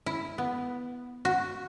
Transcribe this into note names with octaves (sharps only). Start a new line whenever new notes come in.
E4
B3
F#4